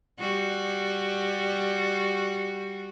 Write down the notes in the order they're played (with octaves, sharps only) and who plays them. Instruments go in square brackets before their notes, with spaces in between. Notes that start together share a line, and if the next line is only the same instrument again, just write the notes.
[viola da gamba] G3 F#4